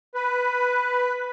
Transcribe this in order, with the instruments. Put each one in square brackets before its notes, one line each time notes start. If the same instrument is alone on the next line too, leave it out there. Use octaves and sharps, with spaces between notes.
[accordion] B4